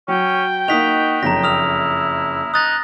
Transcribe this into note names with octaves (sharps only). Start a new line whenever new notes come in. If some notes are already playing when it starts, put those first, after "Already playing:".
F#3 C#4 G5
A#3 D#4 F#4 D#5 D#6 B6 F7
F#1 F2 A#5 A#6
E4 D#6 F6 F7
D#4 D#6 F#6 A6 A#6